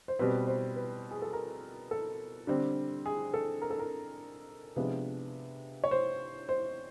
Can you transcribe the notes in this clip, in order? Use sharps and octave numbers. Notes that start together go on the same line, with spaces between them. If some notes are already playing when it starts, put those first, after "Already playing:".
C5
B2 G3 C4 B4
C5
B4
G#4
A4
A#4
A4
D3 G3 C4
G#4
A4
A#4
A4
A#4
C3 F3 G#3 B3 D4 B4
C#5
C5
C5